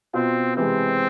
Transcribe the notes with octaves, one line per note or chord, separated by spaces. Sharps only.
B2 B3 C4 F4
C3 E3 G#3 C4